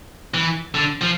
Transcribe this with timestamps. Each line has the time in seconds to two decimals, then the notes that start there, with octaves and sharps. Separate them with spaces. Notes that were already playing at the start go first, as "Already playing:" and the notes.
0.34 E3
0.75 D3
1.01 F3